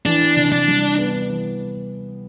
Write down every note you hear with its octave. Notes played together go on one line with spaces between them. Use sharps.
E3 D4
C3
D4
G3
B3
E3